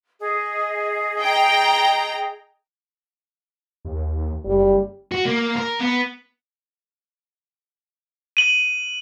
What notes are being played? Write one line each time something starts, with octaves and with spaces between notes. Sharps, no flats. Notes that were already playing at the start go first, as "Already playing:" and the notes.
G#4 D#5
G5 A#5
D#2
F#1 G3
F#4
A#3
A#4
B3
D#7 F#7